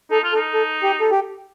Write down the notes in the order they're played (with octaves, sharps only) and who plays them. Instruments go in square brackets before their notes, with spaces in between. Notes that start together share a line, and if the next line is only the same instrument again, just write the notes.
[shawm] D#4 [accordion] A4
[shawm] F4
[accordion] A4
[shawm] D#4
[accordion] A4
G4
A4
G4